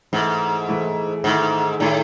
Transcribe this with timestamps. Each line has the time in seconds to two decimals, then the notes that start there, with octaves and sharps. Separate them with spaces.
0.13 G#2 E3 A3 E4
0.69 E3 A3 E4
1.24 G#2 D#3 A3 E4
1.80 A2 D#3 A3 E4